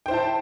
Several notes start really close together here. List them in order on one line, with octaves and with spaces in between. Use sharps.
G5 C5 E4 A5